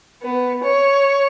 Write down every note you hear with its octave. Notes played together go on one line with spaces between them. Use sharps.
B3
C#5